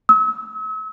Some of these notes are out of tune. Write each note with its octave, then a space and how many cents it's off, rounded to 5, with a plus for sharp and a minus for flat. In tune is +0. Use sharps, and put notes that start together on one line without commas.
E6 -40